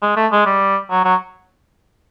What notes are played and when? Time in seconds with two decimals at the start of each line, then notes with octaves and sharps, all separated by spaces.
0.02 G#3
0.17 A3
0.32 G#3
0.46 G3
0.90 F#3
1.05 F#3